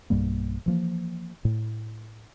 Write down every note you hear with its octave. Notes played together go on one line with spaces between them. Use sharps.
B1 G2 G3 A#3
E3 F3 A#3
A2